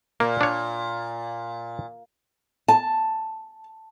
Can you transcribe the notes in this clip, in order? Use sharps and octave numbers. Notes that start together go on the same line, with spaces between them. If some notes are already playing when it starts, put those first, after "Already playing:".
A#2 A#3
D4 C#5
A5